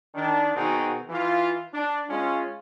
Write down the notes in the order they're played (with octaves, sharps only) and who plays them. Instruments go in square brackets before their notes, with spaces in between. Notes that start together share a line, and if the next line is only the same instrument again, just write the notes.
[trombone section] D#3 D4
B2 D#3 C4 D#4 F#4 G#4
E3 F4
D4
G#3 C#4 F4